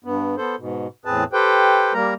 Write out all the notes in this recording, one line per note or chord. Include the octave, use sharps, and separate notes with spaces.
G2 B3
B3 A4 C5
G#2 B2
E2 A2 C4 G#4 B4 A5
G4 A4 B4 C5 G5
G3 A#3 A#4 A#5